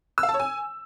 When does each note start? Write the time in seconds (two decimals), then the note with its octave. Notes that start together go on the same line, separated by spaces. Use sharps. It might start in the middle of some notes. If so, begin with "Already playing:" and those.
0.18 E6
0.23 F5
0.29 A5
0.34 C#5
0.40 G#5